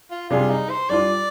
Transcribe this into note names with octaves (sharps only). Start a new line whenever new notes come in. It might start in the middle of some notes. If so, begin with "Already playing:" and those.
F4
C3 G3 D4 F4 G#4
D#4
C5
G3 D4 F4 D5